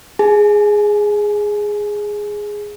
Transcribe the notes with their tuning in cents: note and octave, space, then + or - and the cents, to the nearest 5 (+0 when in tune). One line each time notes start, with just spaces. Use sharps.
G#4 +0 G#5 +35